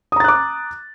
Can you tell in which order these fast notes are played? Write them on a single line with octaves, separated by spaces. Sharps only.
D#6 A#5 A6 F#6 D6